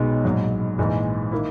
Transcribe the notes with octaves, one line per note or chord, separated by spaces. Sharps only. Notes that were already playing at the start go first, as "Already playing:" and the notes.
Already playing: B1 B2 G#3 D#4
A#1 G#2 F#3
A#1 G#2 E3 G#3
D#3 A#3 E4